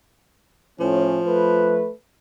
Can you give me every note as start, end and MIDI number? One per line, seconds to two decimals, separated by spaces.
0.80 1.17 45
0.80 1.86 53
0.80 1.17 61
1.25 1.90 57
1.25 1.90 71